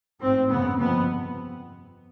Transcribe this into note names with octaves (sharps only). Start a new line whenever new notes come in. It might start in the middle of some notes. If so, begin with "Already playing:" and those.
A1 G#2 C4
G#1 F#2 C#3 B3
G1 F2 C3 B3